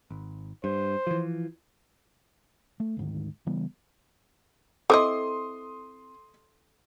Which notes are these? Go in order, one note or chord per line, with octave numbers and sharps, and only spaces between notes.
G#1
G2 C5
E3 F3
A3
D2 G#2 D#3
C#3 E3 G3 B3
C4 E4 A4 D#5 C6 D6 D#6